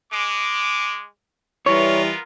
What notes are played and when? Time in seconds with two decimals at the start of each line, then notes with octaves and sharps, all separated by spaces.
0.12 G#3 D6
1.66 E3 G3 B3 E4 F4 A#4 C#5